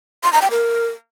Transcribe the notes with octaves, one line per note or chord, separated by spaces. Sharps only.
C6
A#5
G5
A#4